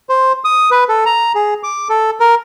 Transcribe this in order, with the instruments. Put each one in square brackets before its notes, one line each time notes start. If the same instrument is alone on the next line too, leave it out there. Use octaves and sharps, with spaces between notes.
[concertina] C5
D#6
B4
A4
A#5
G#4
D6
A4
A#4